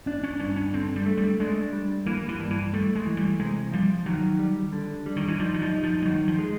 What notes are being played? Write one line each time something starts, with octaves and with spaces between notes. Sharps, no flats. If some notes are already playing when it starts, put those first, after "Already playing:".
C#4 D4
C#4
G2 C#4
C#4
D3 C4
G3
A3
G3
G#3 D4
G3
E3 A#3
E3
G2
E3
G3 A3
G#3
E3
G3
C3 G#3
F3 G3
D#3 F#3
G3
D3
G3
D#3
E3
F3 D#4
F#3
F3
D#4
F3
G3
D#3 F#3
F3
G#3